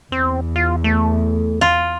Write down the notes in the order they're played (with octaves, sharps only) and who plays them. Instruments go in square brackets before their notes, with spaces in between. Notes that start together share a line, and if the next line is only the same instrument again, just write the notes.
[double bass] E2 [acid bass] C4
[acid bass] F4
A3
[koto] F4